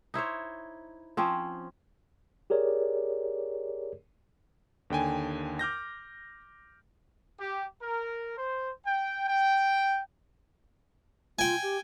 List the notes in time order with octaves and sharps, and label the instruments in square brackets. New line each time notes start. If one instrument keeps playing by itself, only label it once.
[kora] D#4 E4 C5 C#5
F3 C4 C#4
[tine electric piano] G4 G#4 A#4 C#5 D5
[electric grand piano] D#2 D3 G5 G#5
D6 F6 G6 A#6
[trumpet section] G4
A#4
C5
G5
G5
[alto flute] F4 [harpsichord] G5 G#5
[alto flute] G4